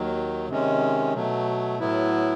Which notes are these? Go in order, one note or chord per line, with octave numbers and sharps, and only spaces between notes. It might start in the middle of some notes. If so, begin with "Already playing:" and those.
Already playing: D#2 D#3 F#3
C3 D#3 G#3 C#4
B2 F#3 A3
A2 F#3 B3 E4